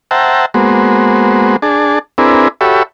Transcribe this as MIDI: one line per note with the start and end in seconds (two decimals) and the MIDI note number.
0.11 0.46 72
0.11 0.46 76
0.11 0.46 78
0.11 0.46 79
0.11 0.46 81
0.11 0.46 82
0.54 1.56 56
0.54 1.56 58
0.54 1.56 59
0.54 1.56 66
0.54 1.56 72
1.62 1.99 62
1.62 1.99 68
1.62 1.99 81
2.18 2.48 60
2.18 2.48 62
2.18 2.48 64
2.18 2.48 68
2.18 2.48 70
2.18 2.48 71
2.61 2.83 66
2.61 2.83 67
2.61 2.83 69
2.61 2.83 73
2.61 2.83 76
2.61 2.83 83